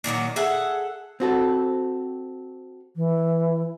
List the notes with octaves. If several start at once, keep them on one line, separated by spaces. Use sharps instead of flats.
A#2 D#3 F#3 A#3
G#4 A4 E5 F#5
C4 F#4 A4
E3